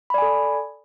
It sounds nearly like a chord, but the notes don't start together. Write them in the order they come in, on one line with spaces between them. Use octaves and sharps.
B5 D5 G#5 A4